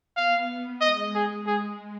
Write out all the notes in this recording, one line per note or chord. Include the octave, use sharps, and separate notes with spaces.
B3 F5
G#3 D#5
G#3 G#4
G#3 G#4